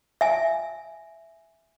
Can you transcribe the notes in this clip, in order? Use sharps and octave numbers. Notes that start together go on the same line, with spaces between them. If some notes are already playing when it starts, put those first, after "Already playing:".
E5 G#5